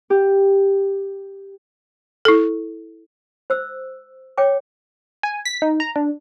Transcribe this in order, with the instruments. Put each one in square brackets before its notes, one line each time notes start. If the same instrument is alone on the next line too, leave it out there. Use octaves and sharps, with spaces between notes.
[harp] G4
[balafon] E4 A4
[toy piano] C5 E6
C#5 G5 D6
[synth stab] G#5
B6
D#4
A#5
D4